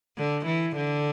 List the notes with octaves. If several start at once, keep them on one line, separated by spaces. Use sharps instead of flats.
D3
E3
D3